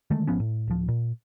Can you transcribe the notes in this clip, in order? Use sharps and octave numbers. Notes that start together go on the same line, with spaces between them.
D3 D#3 G#3 A3
G#1 F3 B3 C#4
A2
D1 F3
A#2